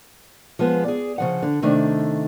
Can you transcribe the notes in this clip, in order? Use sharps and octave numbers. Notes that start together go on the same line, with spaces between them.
F3 G#3 B3
G#4 D5
C#3 F3 F#5
D3
C3 D#3 A3 D4